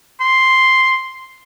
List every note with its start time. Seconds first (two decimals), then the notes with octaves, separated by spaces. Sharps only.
0.20 C6